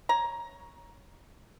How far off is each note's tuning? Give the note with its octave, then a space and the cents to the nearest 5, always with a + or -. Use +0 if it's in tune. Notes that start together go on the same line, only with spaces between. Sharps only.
C#5 +0 A#5 +15